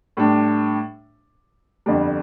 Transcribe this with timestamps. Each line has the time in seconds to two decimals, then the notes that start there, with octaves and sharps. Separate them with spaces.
0.17 A2 G3 D4
1.86 G1 F2 D3 G3